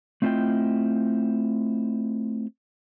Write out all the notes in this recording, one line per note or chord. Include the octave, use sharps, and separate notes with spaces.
A3 C4 E4 F4 D#5 G5